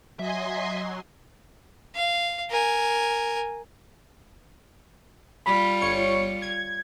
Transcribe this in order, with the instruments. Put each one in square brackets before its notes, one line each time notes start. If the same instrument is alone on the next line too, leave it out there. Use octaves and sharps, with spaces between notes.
[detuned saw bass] F#3 [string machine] D#5 G#5 C6 [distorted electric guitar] E5
[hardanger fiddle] F5
A#4 G#5
[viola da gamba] G3 F4 [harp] B5
[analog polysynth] G1 C#5 C#7
G#6